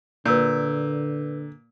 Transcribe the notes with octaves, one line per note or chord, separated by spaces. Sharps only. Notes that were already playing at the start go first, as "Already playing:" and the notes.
A#2 D3 B4 E6 G6